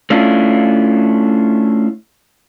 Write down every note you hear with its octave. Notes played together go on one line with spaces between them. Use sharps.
A3 C#4 D4 E4 F4